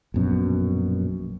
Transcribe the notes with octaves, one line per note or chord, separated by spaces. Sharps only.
A#1 F#2 B2